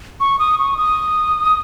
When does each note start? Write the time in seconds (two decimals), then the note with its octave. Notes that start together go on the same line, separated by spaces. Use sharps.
0.20 C#6
0.39 D#6
0.58 C#6
0.77 D#6